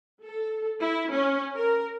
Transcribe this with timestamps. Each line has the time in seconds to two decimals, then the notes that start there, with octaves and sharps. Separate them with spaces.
0.24 A4
0.81 E4
1.11 C#4
1.55 A#4